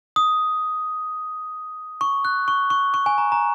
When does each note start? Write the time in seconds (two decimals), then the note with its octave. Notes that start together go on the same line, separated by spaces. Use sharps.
0.16 D#6
2.01 C#6
2.25 F#6
2.48 C#6
2.70 C#6
2.94 C#6
3.06 G#5
3.18 A#5
3.32 A#5